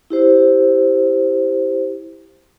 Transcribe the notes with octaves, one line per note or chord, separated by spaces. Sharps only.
E4 G4 C5